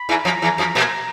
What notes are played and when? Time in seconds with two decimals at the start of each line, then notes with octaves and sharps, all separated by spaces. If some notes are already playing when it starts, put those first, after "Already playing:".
Already playing: B5
0.09 E2 E3
0.25 F2 F3 A#5
0.42 E2 E3
0.58 F2 F3
0.75 A#2 A#3